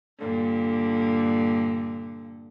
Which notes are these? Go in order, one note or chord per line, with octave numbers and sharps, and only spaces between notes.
G2 A#2 D3